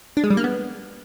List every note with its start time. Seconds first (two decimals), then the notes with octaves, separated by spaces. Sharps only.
0.17 D4
0.24 G#3
0.30 G3
0.37 A#3
0.44 B3